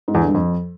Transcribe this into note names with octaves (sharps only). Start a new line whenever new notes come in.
G#2
E2
D3
G2
F2